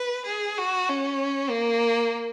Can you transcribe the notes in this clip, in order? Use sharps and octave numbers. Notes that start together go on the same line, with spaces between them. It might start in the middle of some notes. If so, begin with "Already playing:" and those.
Already playing: B4
G#4
F#4
C#4
A#3